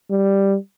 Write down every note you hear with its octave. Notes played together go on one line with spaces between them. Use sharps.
G3